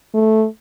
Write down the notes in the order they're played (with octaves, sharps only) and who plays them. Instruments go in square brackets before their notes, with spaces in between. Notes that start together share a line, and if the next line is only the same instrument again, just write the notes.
[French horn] A3